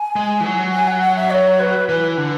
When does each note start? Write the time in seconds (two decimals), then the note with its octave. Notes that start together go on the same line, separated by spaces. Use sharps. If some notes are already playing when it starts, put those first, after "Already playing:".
Already playing: G#5
0.16 G#3
0.40 E3
0.45 F#3
0.74 G#5
0.87 F#5
1.02 F#5
1.16 E5
1.31 C#5
1.60 B4
1.88 E3 B4
2.18 D3